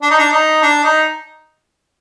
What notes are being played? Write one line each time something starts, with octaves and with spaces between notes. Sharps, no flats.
D4
D#4
D4
D#4
D4
D#4